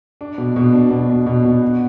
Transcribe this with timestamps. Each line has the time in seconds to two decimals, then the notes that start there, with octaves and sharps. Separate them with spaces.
0.21 D4
0.38 B2
0.56 B2
0.73 D4
0.91 B2
1.10 B2
1.26 B2
1.45 B2
1.62 F#4